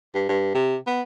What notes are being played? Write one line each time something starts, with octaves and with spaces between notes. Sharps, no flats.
G2
G2
C3
B3